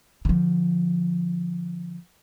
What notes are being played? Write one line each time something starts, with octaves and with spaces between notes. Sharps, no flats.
D3 F3